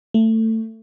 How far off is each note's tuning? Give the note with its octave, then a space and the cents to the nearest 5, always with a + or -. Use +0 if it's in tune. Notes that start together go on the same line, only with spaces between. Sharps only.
A3 +20